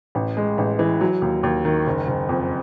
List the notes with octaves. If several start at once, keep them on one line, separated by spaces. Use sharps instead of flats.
A1
G#3
A1
E3
F#3
D#2
D#2
D#3
F#1
F#1
F2